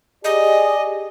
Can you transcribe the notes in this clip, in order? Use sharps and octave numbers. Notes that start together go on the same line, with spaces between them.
G4 G#4 D5 D#5